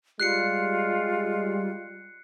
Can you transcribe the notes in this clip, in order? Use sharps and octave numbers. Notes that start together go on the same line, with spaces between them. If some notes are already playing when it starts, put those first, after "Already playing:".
G3 G#3 F4 F#6 C7 C#7